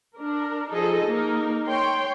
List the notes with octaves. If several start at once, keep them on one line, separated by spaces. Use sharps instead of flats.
D4 A#4
F3 D#4 G#4 A4 D#5
A#3 D#4 A#4
C#5 G5 C6